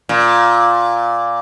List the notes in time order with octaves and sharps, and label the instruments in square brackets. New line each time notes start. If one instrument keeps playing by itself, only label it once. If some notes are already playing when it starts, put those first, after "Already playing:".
[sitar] A#2